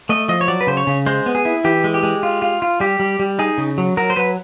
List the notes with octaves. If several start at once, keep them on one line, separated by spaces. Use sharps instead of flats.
A3 D#5
F3 D#5
C#5
F#3 D5
B4
C#3 C5
C#5
C#3
G#3 C5
B3
G#4
E4
E3 G4
G#3
G4
G#3
F4
F4
F4
G3 G4
G3
G3
D#4 G#4
C#3
F#3
F#3 A#4
C5
F#3 B4